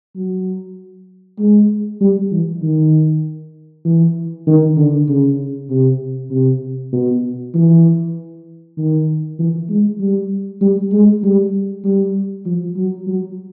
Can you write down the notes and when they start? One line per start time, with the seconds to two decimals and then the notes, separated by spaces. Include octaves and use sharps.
0.16 F#3
1.39 G#3
2.01 G3
2.32 E3
2.62 D#3
3.85 E3
4.47 D#3
4.77 D3
5.08 C#3
5.70 C3
6.31 C3
6.93 B2
7.55 E3
8.78 D#3
9.39 E3
9.69 G#3
10.00 G3
10.61 G3
10.92 G#3
11.24 G3
11.85 G3
12.46 F3
12.77 F#3
13.07 F#3